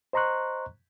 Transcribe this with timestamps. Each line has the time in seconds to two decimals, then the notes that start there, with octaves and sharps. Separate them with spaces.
0.13 C5 D#5 A#5 C6 C#6 F#6